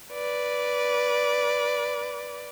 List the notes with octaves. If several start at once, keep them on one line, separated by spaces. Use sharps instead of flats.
B4 D5